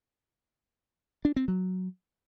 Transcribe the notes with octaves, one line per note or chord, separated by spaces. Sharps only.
D4
C4
F#3